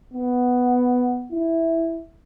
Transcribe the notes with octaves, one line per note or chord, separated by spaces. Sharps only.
B3
E4